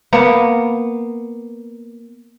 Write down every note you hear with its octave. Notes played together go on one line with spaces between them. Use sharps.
A#3 B3